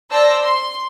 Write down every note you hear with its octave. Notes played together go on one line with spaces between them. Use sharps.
C5 D5 A5 E6 A#6
C6